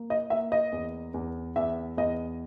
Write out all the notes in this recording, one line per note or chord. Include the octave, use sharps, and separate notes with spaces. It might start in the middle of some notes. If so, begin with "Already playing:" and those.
Already playing: A#3
D#5
A#3 E5
D#5
E2
E2
E2 E5
E2 D#5